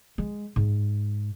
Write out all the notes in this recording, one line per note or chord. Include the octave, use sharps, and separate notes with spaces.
G#3
G#2